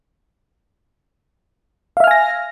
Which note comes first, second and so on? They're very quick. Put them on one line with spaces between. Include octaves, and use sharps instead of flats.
F5 E5 F6 G#5 A#6